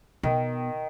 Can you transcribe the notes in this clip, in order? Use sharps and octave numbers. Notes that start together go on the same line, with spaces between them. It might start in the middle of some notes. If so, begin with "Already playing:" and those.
B2 D#3